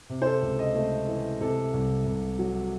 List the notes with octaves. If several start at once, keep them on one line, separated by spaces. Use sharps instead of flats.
C3
C5
A4
C#2
D#5
A3
E3
C3 A4
C2
C2
F#3